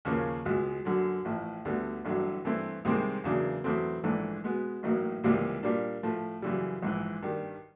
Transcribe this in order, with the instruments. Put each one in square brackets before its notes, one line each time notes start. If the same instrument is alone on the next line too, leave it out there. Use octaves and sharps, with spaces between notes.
[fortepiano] D#2 C#3 F3 A#3 C#4
C#2 B2 G#3
F#2 D3 F#3
A1 A2 F3
D2 D3 G3 B3
A1 G2 D3 F#3
G2 E3 A3 C4 E4
C2 C3 D#3 G#3 C4
E2 C#3 F#3 A#3 D4
E2 B2 F#3 A3 C4
A#1 G#2 E3 A3 D4
B2 G#3 B3
A1 A2 F#3 A#3 D#4
C#2 C3 E3 G3 A#3
A#2 G3 A#3 D4
A2 F3 A3
F#2 C#3 E3 G3
A#1 G#2 E3
G2 D#3 G3